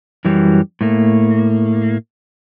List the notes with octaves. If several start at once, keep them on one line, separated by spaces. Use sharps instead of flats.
F#2 E3 F#3 G3
A2 A3 A#3